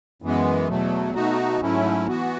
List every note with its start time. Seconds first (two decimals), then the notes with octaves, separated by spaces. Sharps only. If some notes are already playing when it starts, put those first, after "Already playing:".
0.22 F#2 E3 G#3 B3
0.68 E2 B2 F#3 A3
1.14 B2 A3 D#4 F#4
1.61 G#2 F#3 A3 C#4 E4
2.07 E3 B3 F#4